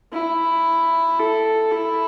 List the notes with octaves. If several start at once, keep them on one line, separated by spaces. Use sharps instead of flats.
E4
A4
E4